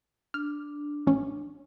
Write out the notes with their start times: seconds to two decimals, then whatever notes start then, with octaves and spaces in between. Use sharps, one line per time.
0.34 D4 F6
1.07 A1 C#4